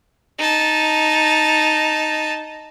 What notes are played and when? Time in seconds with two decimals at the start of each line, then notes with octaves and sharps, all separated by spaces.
0.39 D#4 A5